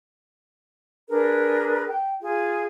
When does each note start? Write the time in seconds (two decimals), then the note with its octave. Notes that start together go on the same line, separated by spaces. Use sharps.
1.08 D4 G#4 A#4 B4
1.87 G5
2.21 F4 G#4